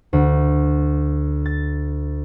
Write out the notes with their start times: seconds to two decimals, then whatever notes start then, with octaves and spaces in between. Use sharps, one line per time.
0.13 D2
1.46 A6